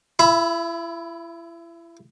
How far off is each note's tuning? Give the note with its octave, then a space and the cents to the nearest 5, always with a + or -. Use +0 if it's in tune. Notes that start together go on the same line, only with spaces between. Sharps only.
E4 +35 E5 +0 B5 +0